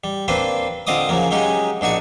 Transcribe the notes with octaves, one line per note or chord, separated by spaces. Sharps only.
G3
A#3 C4 D4 B4 C5
D3 C4 F4 D#5 D6 D#6
C#3 F3 F#3 A#3
F#3 G#3 C#4 D#4 G4
A#1 D4 D#4 F#4 C#6